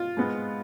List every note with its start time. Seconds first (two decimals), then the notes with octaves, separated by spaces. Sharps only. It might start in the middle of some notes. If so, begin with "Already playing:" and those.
Already playing: F4
0.17 G#2 G#3 B3